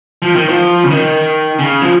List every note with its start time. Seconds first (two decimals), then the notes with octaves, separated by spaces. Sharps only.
0.22 F3
0.35 D#3
0.49 F3
0.84 C#3
0.90 D#3
1.59 C#3
1.82 F3